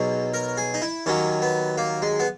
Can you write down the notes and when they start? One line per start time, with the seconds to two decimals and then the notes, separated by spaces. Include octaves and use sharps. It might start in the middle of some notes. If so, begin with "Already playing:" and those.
Already playing: B1 B2 F#3 G#4
0.34 A#4
0.57 G#4
0.74 D#4
0.82 E4
1.06 D#2 D#3 F#3 C#4
1.42 B3
1.78 A#3
2.02 G#3
2.19 B3